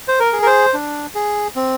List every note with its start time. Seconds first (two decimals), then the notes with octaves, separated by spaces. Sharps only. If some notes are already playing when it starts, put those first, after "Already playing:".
0.08 C5
0.20 A#4
0.33 G#4
0.42 A#4
0.47 C5
0.74 D4
1.15 G#4
1.56 C4